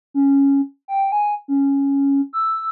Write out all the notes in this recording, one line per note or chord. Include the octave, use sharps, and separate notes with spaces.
C#4
G5
G#5
C#4
E6